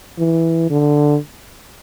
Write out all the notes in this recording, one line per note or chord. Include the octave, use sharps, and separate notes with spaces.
E3
D3